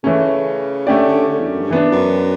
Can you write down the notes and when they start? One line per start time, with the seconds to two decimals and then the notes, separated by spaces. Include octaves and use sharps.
0.03 C#3 E3 A3 C#4
0.87 D3 A3 C#4 G4 D5
1.08 D3
1.29 D3
1.39 E2
1.50 F#2
1.61 G2
1.70 E3 B3 D4
1.92 F#2